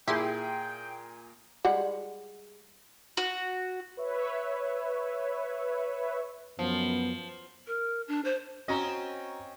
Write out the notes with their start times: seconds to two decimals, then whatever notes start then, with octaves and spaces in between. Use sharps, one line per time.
0.08 A#2 E4 G4 G#4 G5 C6
1.65 G3 G#3 F#5
3.17 F#4
3.97 B4 C#5 E5
6.59 F#2 F3 B3
7.67 A#4
8.08 D4
8.25 C5
8.68 C4 C#4 F#4 D#5 A#5